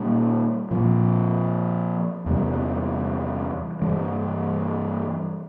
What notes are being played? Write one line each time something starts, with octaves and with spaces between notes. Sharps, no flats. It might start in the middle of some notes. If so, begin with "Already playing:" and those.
Already playing: A#2 G3 A#3 C#4
A#2 F3 C4
E2 C3 E3 G3
G2 E3 G3